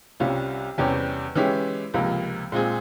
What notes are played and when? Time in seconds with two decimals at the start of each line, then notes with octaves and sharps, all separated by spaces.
0.20 C2 C3 G3 C#4 F4
0.78 E2 C3 G3 C#4 G4
1.35 E3 G#3 C#4 E4 G4
1.94 C#2 C3 F3 A#3
2.52 A#2 G#3 C4 F4 G#4